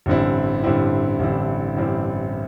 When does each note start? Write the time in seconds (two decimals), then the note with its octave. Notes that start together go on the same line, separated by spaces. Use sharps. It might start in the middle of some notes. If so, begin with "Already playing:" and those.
0.06 A1 G2 D3 C4 E4
0.64 A1 G2 D3 C4 E4
1.20 A1 G2 D3 C4 E4
1.77 A1 G2 D3 C4 E4